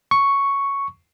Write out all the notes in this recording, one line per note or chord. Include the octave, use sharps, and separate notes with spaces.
C#6